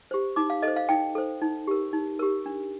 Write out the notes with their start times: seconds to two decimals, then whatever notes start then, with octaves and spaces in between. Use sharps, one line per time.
0.11 G4 C5
0.36 D#4 D6
0.50 F5
0.62 A4 C5 D#5
0.76 F5
0.89 D#4 G5
1.15 A4 C5
1.41 D#4
1.67 G4 A#4
1.93 D#4
2.19 G4 A#4
2.46 D4